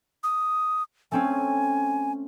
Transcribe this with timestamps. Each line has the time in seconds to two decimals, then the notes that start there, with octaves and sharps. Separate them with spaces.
0.23 D#6
1.12 A3 C4 C#4 G#5